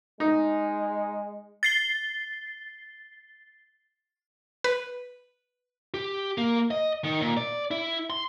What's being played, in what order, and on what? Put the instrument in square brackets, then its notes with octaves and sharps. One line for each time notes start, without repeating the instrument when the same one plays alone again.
[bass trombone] G#3 [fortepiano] D#4
[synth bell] A6 C7 G7
[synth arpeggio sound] B4
[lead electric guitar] G4
A#3
D#5
D#3
A#2
D5
E4
C6